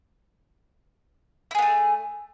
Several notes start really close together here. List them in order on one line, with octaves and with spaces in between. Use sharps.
E4 G#4 B3 A3